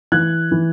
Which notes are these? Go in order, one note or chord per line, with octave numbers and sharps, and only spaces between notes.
E3 F#6 G#6
E3